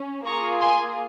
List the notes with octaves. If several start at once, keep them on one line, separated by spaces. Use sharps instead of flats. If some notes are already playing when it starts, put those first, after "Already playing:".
Already playing: C#4
A#3 F4 G#4 A#5 C#6
G#5 C6